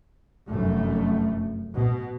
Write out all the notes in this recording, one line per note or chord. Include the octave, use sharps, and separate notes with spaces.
F1 F#2 A3
B2